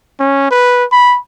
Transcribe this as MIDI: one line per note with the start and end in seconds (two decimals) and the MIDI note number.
0.20 0.50 61
0.51 0.84 71
0.92 1.18 83